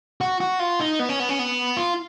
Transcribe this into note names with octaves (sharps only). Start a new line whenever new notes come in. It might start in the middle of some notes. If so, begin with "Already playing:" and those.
F#4
F#4
F4
D#4
B3
C#4
B3
C#4
B3
F4